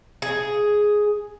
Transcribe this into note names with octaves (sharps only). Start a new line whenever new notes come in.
G#4